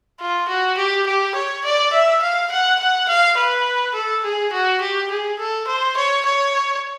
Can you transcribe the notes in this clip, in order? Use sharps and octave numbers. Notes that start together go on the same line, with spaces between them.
F4
F#4
G4
G4
C#5
D5
E5
F5
F#5
F#5
F5
B4
A4
G#4
F#4
G4
G#4
A4
C5
C#5
C#5